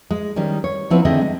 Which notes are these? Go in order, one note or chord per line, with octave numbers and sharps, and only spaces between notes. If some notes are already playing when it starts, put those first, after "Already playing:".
G#3
D#3 G3 C#4
C#5
F3 B3 C4 E4 B4
D3 D#3 C4 G#4 D#5 E5
G#3